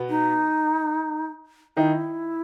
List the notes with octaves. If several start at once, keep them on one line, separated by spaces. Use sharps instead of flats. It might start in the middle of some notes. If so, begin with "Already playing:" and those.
Already playing: B2 B3
D#4
D#3 D#4 E4